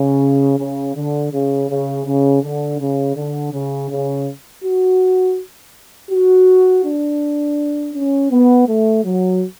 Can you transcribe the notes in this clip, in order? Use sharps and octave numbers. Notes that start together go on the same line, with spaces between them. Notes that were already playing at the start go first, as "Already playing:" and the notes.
Already playing: C#3
C#3
D3
C#3
C#3
C#3
D3
C#3
D3
C#3
C#3
F#4
F#4
D4
C#4
B3
A3
F#3